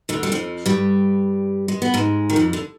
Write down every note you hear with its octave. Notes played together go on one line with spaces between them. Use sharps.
D2 D3
G3
F2 F3
G2 G3
G#3
B3
G#2 G#3
D#3
F2 F3
D3